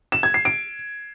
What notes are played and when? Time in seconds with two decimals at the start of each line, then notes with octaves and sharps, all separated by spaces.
0.12 E7
0.23 G#6
0.34 C7
0.45 D7